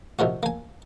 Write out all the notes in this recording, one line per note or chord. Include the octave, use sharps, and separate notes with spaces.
C3 D#3 F3 F#4
A#3 G#5